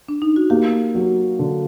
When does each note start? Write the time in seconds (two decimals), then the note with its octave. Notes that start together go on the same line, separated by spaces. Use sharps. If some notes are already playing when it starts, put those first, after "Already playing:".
0.08 D4
0.22 D#4
0.36 F#4
0.50 A#3 G4
0.95 F#3
1.39 D3